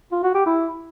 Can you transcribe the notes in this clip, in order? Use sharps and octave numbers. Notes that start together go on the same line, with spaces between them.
F4
F#4
G4
E4